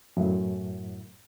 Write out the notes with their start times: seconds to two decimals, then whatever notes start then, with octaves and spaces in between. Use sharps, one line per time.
0.17 F#2 A2